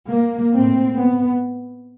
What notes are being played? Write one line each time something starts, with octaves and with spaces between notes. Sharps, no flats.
A#3
A2 C4
B3